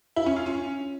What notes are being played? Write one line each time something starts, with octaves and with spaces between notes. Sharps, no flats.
E4
C#4
F4
C#4